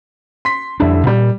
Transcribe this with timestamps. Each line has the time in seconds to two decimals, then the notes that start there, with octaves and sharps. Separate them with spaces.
0.45 C6 B6
0.80 F2 D3 G3 D4 E4
1.07 A#2 G3